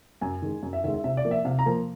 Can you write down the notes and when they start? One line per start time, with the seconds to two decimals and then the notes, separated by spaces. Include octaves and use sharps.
0.21 F#2 G#5
0.42 D#3 G#3
0.63 F#2
0.73 E5
0.84 D#3 E5
0.87 G#3
0.94 E5
1.04 C3 E5
1.17 D5
1.25 F3 A#3
1.31 E5
1.45 C3 F5
1.59 A#5
1.66 F3 A#3